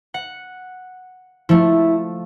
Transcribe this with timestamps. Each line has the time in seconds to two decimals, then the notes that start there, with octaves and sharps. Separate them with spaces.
0.14 F#5
1.49 F3 A3 E4